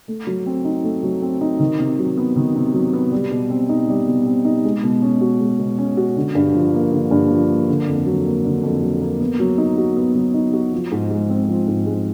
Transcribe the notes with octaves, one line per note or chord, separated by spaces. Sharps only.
A3
F#3
C4
D#4
A3
F#3
C4
D#4
D#3
C3
F#3
B3
D#3
C3
F#3
B3
G3
B2
C4
D#4
G3
B2
C4
D#4
G#3
B2
C#4
F#4
G#3
B2
C#4
F#4
D3
G2
F3
A#3
D3
G2
F3
A#3
D3
F2
F#3
A#3
D3
F2
F#3
A#3
B3
F#3
D#4
F#4
B3
F#3
D#4
F#4
F3
G#2
G#3
C4
F3
G#2
G#3